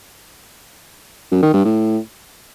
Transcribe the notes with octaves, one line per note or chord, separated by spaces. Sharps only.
F#2
D#3
G2
A2